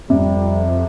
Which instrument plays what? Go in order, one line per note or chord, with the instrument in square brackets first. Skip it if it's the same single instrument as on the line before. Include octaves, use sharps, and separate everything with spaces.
[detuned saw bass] F2 [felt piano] C3 [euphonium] G3